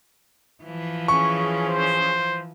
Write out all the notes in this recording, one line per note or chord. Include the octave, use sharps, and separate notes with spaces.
E3 F3
C#4 G#4 C#6
C5